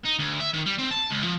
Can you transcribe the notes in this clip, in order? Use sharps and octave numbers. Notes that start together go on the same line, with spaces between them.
D#4
D2
E5
D#3
G3
C4
A5
C#2
F3